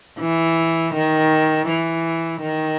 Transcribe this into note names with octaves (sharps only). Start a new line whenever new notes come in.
E3
D#3
E3
D#3